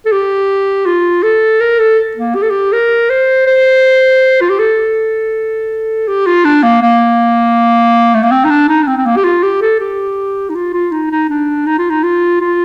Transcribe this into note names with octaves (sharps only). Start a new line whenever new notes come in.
A4
G4
F4
A4
A#4
A4
A#3
G4
A4
G4
A#4
C5
C5
F4
G4
A4
G4
F4
D4
A#3
A#3
A3
A#3
C4
D#4
D4
D#4
D4
C4
C4
A#3
G4
F4
G4
A4
G4
D#4
F4
F4
D#4
D#4
D4
D#4
F4
D#4
F4
F4